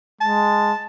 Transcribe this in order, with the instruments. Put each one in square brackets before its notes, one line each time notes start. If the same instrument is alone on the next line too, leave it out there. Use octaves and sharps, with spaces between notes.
[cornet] G#3 [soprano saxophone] A5